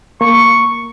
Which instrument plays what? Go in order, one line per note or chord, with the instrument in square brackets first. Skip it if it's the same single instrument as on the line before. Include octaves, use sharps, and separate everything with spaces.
[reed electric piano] A#3 [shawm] C#6